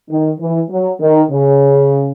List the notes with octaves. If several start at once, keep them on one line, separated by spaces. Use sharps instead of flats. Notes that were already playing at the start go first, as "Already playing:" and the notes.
D#3
E3
F#3
D#3
C#3